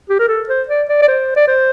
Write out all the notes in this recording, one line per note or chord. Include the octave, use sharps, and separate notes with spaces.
G4
A#4
A4
C5
D5
D5
D5
C5
D5
C5